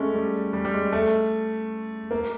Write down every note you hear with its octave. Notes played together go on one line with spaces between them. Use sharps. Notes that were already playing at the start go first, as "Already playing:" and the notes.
Already playing: G#3 A3 C#4
G3
G3
G3
G#3
A3
A#3